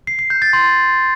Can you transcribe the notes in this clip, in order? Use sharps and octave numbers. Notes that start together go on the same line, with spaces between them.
C7
C7
G6
A6
C6